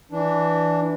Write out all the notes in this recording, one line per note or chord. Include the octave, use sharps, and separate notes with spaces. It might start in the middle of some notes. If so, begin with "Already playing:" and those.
E3 D4